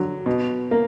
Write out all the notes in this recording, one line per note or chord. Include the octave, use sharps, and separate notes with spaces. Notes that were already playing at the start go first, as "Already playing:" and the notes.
Already playing: D3 F#3
B2
A#3